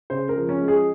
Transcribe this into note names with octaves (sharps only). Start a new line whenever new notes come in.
C#3 C5
A#4
F3
C#4
G#3
G#4